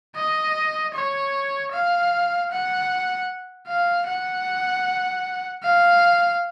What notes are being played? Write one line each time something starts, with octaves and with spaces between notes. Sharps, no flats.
D#5
C#5
F5
F#5
F5
F#5
F5